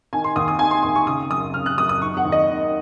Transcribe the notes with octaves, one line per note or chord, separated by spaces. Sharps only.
D#3 G#5
C6
D#2 D#6
D#6
D#3 G#5
C6
D#2 C6
C#6
C#3 D#6
F#2 D#6
C#3 F6
F#6
F#2 D#6
D#6
D#3 C#6
F#5
D#2
D#5
D#3